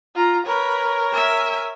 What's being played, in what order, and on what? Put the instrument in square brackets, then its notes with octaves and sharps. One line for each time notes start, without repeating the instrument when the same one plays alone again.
[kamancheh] F4 A#5
[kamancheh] A#4 C#5 [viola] B4
[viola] E5 G#5